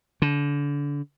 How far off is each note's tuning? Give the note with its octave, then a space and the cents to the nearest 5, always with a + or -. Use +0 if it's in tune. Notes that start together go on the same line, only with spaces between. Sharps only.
D3 -30